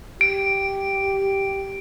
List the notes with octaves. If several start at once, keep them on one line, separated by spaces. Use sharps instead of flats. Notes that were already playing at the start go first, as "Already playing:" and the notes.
G4 D7